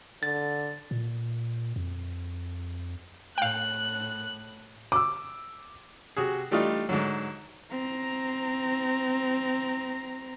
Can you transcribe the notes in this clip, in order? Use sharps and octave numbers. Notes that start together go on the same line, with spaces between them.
D3 A6
A#2
F2
A2 F5 G5 F#6
D6 E6
C3 F#4 G#4
E3 G3 A3 D4 D#4 F4
G#2 D3 F#3
C4 A#5